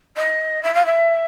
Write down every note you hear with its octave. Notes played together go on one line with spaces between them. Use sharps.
D#5
E5
F5
E5